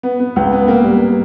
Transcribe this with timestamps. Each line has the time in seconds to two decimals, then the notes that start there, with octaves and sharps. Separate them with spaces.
0.03 B3
0.20 B3
0.36 C#2
0.53 B3
0.68 A#3
0.84 G3